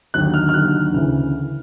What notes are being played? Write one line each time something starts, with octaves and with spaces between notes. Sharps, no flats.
D#2 D3 F#3 F#6
F6
F6
D#2 D3 F#3 F#6
D2 C#3 E3